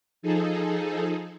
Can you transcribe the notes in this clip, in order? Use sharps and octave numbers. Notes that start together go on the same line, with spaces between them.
F3 D#4 G#4 A4